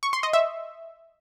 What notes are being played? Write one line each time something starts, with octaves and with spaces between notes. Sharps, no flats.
C#6
C6
D#5
E5